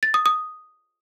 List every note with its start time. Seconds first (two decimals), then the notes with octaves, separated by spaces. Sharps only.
0.03 A6
0.14 D#6
0.26 D#6